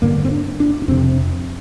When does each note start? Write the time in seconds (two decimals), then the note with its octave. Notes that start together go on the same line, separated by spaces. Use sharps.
0.02 G2 D3 A#3
0.25 C4
0.31 D4
0.60 D4
0.82 D4
0.88 F2 C3 C4